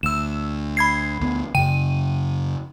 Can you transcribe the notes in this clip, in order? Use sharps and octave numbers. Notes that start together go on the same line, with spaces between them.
D2 E6 E7
B5 G#6 C7
D2 B3
F#2 C#3 G5 D#7